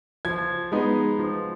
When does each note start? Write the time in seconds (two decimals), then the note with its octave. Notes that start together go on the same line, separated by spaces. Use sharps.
0.25 F3 G#6
0.72 G#3 B3 D#4
1.19 F3